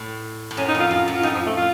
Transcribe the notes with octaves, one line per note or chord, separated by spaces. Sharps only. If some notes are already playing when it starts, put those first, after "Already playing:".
Already playing: A2
A2
F#2 C#4
D#4
F2 F4
F#2 F4
F#2
F4
F2 D#4
F3
A3
F4